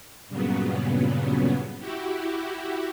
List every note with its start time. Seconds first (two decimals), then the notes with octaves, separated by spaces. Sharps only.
0.29 G2 A#2 C#3 F#3 B3
1.78 E4 F#4 G4